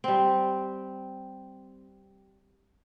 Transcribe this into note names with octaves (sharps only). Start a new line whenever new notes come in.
G3 C4